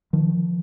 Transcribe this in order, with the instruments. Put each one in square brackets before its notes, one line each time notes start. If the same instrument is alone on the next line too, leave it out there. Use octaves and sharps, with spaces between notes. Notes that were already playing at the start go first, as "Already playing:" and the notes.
[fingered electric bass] D#3 F3